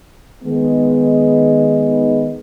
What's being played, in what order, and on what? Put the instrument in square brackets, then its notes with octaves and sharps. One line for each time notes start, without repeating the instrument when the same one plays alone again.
[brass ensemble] D#3 G#3 B3